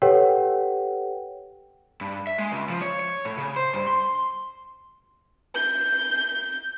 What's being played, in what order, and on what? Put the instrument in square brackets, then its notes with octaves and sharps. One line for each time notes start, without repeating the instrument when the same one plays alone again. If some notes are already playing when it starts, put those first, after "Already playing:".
[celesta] G4 A4 B4 C#5 F#5 G5
[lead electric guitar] G2
E5
G#3
C#2
F3
C#5
C#5
A2
C#3
C5
G2
C6
[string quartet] G6